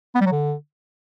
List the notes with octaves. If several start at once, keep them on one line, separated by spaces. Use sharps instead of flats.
B3
G3
F#3
D3